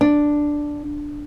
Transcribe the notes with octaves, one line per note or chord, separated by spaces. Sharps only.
D4